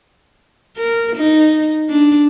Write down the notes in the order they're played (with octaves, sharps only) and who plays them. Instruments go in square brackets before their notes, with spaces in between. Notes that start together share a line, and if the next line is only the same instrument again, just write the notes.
[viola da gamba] A#4
D#4
D4